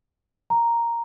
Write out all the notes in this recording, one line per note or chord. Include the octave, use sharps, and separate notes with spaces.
A#5